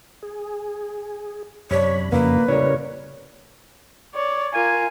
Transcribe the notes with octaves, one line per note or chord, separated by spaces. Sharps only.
G#4
F#2 C3 D4 C#5 B5
F2 C#3 A#3 B3 E4 B4
A2 C#3 G3 A#4 C#5
C#5 D5
F4 A#4 G#5